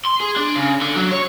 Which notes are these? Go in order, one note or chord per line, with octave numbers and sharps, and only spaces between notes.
C6
G#4
D4
C#3
D3
F#3
C#5